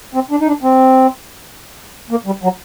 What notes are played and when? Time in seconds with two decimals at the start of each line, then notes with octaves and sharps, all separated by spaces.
0.15 C4
0.31 D4
0.41 D#4
0.47 D4
0.63 C4
2.11 A#3
2.26 G3
2.43 F#3